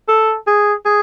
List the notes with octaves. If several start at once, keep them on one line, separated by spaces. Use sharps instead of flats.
A4
G#4
G#4